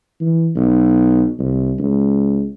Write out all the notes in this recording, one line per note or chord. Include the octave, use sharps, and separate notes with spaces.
E3
B1
C2
C#2